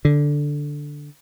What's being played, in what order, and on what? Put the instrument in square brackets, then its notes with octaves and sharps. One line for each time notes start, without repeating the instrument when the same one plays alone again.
[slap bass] D3